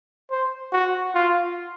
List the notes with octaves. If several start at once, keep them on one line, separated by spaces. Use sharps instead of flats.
C5
F#4
F4